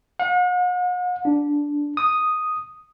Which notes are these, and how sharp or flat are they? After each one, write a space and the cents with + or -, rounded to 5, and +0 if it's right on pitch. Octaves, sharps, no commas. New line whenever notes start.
F#5 -45
D4 -10
D#6 +0